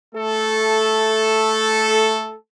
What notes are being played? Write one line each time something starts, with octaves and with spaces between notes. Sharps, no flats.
A3 A4